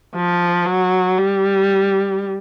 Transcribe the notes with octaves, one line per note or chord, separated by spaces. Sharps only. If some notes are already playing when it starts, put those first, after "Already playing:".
F3
F#3
G3